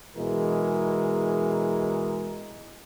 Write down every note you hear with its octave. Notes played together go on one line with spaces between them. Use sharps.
B2 E3 G#3 G#4 A#4